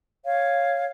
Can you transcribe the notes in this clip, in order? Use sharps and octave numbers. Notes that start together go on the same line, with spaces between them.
C#5 F5